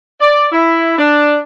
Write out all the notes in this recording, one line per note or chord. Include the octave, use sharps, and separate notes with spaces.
D5
E4
D4